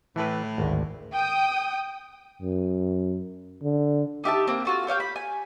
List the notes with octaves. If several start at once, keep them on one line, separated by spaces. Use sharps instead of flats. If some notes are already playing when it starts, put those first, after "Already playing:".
A2 E3 B4
G#1 D2
G5 D#6
F#2
D3
D#4 G4 E5 A5
A#3 C4
F4 F#4 A4
G4 C#5 F5 G5
B5
G#5